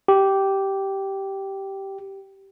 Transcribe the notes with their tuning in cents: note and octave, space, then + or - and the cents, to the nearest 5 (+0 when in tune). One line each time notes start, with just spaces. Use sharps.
G4 -10